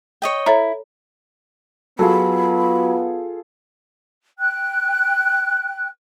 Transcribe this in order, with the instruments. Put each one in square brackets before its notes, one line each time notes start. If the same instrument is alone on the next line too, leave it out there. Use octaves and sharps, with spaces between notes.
[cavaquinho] C#5 D#5 G5
[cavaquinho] E4 [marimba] A4 C#5 A#5
[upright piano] F#3 [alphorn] B3 [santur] F4 G#4 A4 [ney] B5
[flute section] G5 F#6